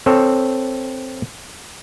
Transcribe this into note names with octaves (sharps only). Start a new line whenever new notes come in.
C4 A4 C#5